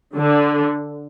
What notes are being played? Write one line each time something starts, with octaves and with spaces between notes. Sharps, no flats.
D3